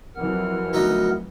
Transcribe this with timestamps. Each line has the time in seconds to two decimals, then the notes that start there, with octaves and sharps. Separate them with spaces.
0.16 F2 E3 F#3 A#4 F#5 F6
0.73 D2 B3 D#4